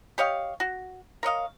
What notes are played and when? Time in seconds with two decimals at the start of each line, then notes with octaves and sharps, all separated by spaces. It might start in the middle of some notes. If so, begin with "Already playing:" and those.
0.18 G4 C#5 D#5 F5
0.60 F#4
1.23 A#4 C#5 D#5 F5